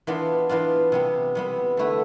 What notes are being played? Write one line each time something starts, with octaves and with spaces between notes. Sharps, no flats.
E3 B3 D4 F4
E3 B3 D4 F4
C3 G3 B3
C3 G3 B3
D3 A3 E4 B4